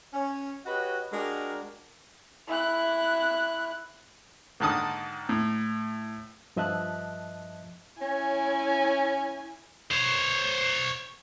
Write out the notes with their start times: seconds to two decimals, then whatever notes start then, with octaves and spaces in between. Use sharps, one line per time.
0.14 C#4
0.66 F#4 G4 B4 C#5 D#5
1.12 G#3 D4 F#4 G4 A#4
2.48 E4 F#6
4.60 G#2 D3 D#3 A5 D#6
5.29 A2
6.56 G2 F3 D#5 E5 A5 F#6
8.01 C#4 E4 C#5 G#5
9.91 C5 C#5